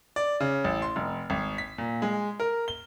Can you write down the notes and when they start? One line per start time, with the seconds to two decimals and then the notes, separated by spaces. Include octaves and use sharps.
0.16 D5
0.40 C#3
0.64 A1
0.82 C6
0.96 F1
1.30 G#1
1.58 B6
1.78 A#2
2.02 G#3
2.40 A#4
2.68 G7